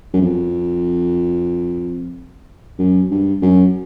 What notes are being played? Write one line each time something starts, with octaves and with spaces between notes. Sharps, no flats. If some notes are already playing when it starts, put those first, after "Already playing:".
F#2
F2
F#2
G2
F#2